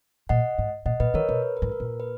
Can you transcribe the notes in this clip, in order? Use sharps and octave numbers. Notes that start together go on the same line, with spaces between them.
A#2 D#5 F#5
G#2
A#2 D#5 F#5
A#2 B4 D#5
D#3 A#4 C#5
B2 B4
A#4
B4
G#2
A#4
A#2
B4
B4